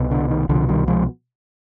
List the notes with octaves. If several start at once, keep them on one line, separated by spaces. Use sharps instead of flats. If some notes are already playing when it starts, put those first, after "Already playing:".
Already playing: C2 B2
D3
D#3
C2 B2 D3 F3
D#3 G3
F3 G#3